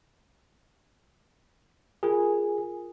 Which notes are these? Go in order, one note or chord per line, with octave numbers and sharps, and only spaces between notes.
F4 G#4 A#4 G#5